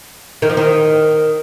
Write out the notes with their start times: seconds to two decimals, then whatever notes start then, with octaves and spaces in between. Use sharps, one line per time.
0.42 D#3
0.50 F3
0.57 D#3